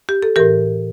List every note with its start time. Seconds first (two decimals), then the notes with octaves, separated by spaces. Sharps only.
0.09 G4
0.23 A4
0.36 E3 G4 A#4
0.40 A2